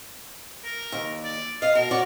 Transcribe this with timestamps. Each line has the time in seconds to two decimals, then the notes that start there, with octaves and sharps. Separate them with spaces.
0.64 A#4
0.92 D#2
1.24 D5
1.62 D#5 F5
1.75 B2 A#4
1.91 F#4 C#5 D5